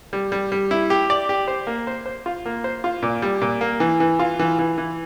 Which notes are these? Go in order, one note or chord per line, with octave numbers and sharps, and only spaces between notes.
G3
G3
G3
E4
G4
D5
G4
C5
A#3
C5
C5
F4
A#3
C5
F4
A#2
G3
A#2
A#3
E3
E3
F4
E3
E3
E3